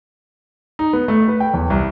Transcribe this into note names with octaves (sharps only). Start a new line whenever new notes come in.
D#4
B3
A3
B4
G5
E2
C2